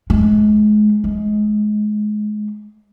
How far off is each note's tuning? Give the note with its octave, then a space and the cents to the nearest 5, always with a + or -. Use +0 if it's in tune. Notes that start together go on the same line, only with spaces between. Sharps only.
G#3 +30
G#3 +25